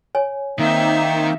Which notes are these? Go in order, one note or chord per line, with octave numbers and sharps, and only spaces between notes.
C#5 G#5
D#3 A#3 C4 D#4 E5